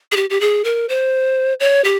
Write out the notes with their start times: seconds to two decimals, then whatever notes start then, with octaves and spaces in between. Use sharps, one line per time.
0.12 G#4
0.16 G4
0.30 G4
0.41 G#4
0.64 A#4
0.89 C5
1.60 C#5
1.84 G4